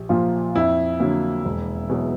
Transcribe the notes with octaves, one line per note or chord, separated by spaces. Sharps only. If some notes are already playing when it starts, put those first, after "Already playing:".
Already playing: A#1 G4
A#2 F3 A#3 F4
F2 E4
D3 F#3 A#3
E1
E2 B2 F#3